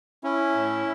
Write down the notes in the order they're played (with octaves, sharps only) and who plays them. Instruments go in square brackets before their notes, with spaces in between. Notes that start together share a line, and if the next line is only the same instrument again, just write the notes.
[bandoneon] C#4 [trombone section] E4
[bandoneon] A2